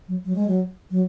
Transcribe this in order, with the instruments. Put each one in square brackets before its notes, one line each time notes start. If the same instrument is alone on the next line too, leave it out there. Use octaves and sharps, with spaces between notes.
[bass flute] F#3
F#3
G#3
F#3
F#3